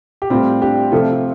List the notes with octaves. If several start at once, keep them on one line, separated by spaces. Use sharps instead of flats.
G4
A2 G3 C4 F4
D4 G4
C3 F3 A3 F4 A4